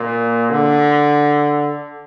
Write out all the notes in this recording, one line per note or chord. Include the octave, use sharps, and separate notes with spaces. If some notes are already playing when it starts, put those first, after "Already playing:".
Already playing: A#2
D3